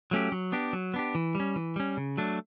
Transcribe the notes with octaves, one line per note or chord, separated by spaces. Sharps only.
F#3 A3 C#4 G4
F#3
B3 D4 G4
F#3
B3 D4 G4
E3
G3 C#4
E3
G3 C#4
C#3
F#3 A3 D4